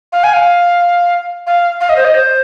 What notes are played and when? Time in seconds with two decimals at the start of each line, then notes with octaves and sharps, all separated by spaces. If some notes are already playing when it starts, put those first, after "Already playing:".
0.13 F5
0.24 G#5
0.34 F5
1.47 F5
1.81 F5
1.89 D#5
1.97 C5
2.05 D#5
2.14 C5